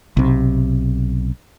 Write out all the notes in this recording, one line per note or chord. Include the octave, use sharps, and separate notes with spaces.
B1 C3